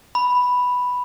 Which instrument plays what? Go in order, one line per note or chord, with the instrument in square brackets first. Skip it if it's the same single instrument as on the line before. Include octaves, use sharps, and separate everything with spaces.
[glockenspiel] B5